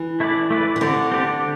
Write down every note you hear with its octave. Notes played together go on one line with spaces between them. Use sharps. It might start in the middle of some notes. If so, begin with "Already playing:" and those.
Already playing: E3
A3 E4 B4 D5
A3 E4 B4 D5
E3
D3 C4 G4 D5
C4 G4 D5